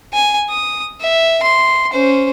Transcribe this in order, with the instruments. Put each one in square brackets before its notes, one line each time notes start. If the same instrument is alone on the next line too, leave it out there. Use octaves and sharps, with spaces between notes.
[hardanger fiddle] G#5
D#6
E5
C6
C#4 C5